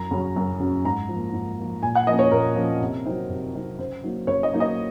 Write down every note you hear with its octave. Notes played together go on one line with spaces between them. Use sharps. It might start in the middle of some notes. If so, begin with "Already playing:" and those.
Already playing: F#2 A#5
C#3 F#3 C#4
F#2
C#3 F#3 C#4
G#2 A#5
F3
A#3
G#2
F3 A#3
A#2 G#5
F#5
F3 A#3 C#4 D#5
C#5
A#2 A#4
F3 A#3 C#4
C3
F#3 C4 D#4
C3
F#3 C4 D#4
C#3 C5
F#3 A#3 D#4
C#3 C#5
D#5
F#3 A#3 D#4
D#5